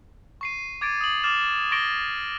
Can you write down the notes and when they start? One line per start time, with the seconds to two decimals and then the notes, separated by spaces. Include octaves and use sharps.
0.41 C#6 C7 D#7
0.81 D6 G#6 A6 D7 D#7
1.01 D#6 F#7
1.24 D6 F6 A6 E7
1.71 C#6 A6 A#6 D7 G7